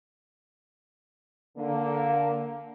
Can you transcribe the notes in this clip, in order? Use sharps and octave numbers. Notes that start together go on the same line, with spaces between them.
D3 A#3